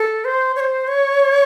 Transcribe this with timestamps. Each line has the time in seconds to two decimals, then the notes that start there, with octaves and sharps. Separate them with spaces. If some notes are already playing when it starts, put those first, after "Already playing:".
Already playing: A4
0.25 C5
0.56 C#5
0.60 C5
0.87 C#5